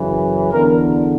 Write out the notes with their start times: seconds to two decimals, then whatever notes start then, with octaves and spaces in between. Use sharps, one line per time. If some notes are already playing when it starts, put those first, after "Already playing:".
Already playing: F#2 C#3 E3
0.52 E2 D3 A#4